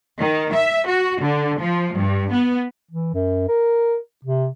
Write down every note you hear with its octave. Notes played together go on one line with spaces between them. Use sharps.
D#3
E5
F#4
D3
F3
G2
B3
E3
F#2
A#4
C3